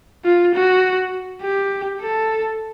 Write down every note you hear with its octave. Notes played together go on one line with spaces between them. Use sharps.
F4
F#4
G4
A4